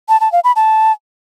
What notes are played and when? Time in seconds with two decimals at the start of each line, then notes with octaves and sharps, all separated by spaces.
0.09 A5
0.21 A5
0.32 F5
0.44 B5
0.56 A5